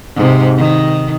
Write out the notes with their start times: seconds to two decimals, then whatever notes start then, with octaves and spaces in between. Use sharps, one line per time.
0.15 G#2 C3
0.58 D#3